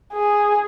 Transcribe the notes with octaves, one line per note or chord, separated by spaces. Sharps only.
G#4